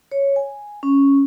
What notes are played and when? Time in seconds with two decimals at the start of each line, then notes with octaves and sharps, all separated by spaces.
0.12 C#5
0.36 G#5
0.83 C#4